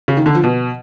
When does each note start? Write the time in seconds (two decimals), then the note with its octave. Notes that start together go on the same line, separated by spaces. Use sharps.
0.08 C#3
0.17 D#3
0.26 D3
0.35 F3
0.44 B2